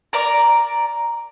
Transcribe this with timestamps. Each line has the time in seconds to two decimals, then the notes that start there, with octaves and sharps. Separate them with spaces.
0.13 A#4 D5 A#5